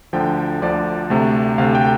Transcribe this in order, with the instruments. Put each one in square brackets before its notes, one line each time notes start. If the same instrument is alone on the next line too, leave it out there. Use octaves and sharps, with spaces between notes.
[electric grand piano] D2 D3 F3 G5
D2 D3 F3 D5
D2 C3 A3
D2 C3 A3 F5
G5